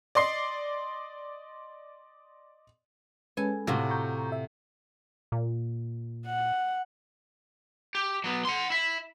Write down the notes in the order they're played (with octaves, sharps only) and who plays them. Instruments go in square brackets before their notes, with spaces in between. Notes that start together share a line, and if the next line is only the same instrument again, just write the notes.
[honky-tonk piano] D5 D#5 C6 C7
[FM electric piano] G#3 C#4 B4 [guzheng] A4 G#5
[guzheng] A2 F4 F#4 [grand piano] C3
[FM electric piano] A#5 C#6 G6
E5
[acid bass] A#2
[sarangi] F#5
[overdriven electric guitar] G4
F#3 B3
F#5 C6
E4 E5